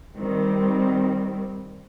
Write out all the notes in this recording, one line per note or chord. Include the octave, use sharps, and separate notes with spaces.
D#3 G3 C4